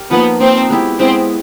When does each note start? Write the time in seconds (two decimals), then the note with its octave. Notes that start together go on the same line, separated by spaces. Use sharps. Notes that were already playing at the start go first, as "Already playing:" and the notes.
Already playing: G4 A#4
0.11 F3 A#3 B3 D#4
0.40 F3 A#3 C4 D#4
0.70 G#3 B3 E4 G4
0.99 G#3 B3 C4 E4 G4